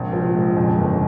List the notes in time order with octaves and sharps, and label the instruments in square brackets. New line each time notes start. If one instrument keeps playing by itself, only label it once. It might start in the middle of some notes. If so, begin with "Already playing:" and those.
Already playing: [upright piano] A#1 [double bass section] G#2 C3
[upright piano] F3
G#3
[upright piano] F2 [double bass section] A#2 C#3
[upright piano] G1